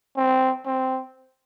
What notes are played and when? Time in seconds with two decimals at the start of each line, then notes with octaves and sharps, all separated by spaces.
0.17 C4
0.66 C4